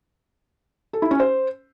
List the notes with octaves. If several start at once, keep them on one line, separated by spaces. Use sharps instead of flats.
A4
E4
C#4
C5